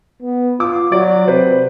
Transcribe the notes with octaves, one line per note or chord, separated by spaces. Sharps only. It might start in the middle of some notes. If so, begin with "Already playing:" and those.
B3
F4 D6
F#3 D5
C3 B4 C5